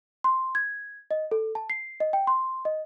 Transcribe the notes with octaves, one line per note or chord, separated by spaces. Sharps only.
C6
G#6
D#5
A4
A5
C7
D#5
G5
C6
D#5